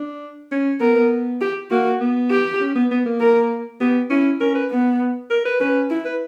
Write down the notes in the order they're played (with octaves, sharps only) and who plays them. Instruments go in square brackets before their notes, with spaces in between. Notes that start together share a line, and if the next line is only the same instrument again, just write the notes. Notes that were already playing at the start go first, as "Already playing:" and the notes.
Already playing: [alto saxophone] D4
C#4
[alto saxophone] B3 [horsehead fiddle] A#4
[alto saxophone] B3
[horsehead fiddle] G4
[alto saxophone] A#3 [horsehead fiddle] F#4
[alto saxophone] B3
[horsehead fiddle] G4
[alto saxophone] C#4
B3
B3
A#3
[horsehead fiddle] A#4
[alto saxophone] B3 [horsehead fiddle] G4
[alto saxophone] C#4 [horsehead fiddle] E4
[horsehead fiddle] C#4 [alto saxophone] A#4
[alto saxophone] B4
[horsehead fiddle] B3
[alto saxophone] A#4
B4
[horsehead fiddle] C#4 [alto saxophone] B4
[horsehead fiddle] E4
[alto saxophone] B4